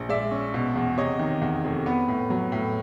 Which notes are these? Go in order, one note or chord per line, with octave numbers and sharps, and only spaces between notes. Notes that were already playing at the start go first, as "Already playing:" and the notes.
Already playing: A#1
G#3 D5 E5
C#4
B2
E2
C3 C#5 D#5
D#3
E2
F1
B3 B4
A2
F#3
A2